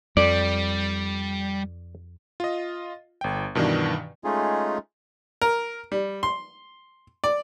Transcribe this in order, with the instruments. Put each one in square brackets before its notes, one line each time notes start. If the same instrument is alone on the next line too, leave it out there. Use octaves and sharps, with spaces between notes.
[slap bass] F2 [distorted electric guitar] G3 [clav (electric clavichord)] D5
[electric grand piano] F4 D#5
G1 G5
G2 B2 D#3 E3 D4
[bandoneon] G#3 A3 C#4 D#4 F4 G#4
[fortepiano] A#4
G3
C6
D5